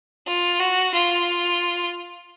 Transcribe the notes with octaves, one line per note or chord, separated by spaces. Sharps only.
F4
F#4
F4